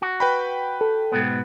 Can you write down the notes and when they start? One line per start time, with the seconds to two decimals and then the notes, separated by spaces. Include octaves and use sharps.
0.02 F#4
0.20 B4 G5 B5
0.81 A4
1.12 G#2 B2 B3